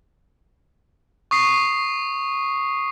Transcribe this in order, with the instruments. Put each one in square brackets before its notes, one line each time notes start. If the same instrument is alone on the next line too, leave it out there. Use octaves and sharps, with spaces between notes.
[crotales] C#6 D#6 C7